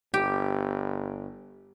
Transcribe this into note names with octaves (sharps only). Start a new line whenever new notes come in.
G1 G4